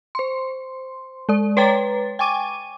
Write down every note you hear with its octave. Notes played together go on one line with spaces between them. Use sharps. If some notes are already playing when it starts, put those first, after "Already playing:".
C5 C6
G#3 D5
B4 C#5 G5 A#5 A6
G5 G#5 C#6 D6 D#7